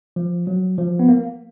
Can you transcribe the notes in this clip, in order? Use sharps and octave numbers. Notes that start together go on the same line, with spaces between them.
F3
F#3
F3
B3
A#3